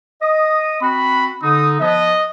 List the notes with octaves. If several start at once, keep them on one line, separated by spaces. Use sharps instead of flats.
D#5 D#6
C4 F#4 B5
D3 D#4 D#6
F3 B3 D#5